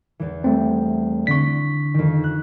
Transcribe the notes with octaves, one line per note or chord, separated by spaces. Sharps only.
E2 E3
G3 A3 C4
D3 C#6 B6
F2 D#3
F#6